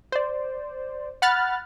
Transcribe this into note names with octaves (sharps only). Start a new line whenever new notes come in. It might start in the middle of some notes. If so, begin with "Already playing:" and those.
C5 D5
F#5 B5 F6 F#6 A6